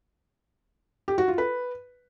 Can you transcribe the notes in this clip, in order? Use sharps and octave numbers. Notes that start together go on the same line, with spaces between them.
G4
F#4
F4
B4